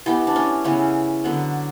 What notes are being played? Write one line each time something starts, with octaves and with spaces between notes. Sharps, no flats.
E3 B3 G4
D4
C#4
C#3 E3 B3 C#4
D3 F#3 B3